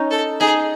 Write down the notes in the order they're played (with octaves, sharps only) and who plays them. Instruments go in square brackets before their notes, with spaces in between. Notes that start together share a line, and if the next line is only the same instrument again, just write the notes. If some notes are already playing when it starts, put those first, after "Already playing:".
Already playing: [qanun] C#4 D#4
[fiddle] A4
[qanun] D#4 [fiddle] G#4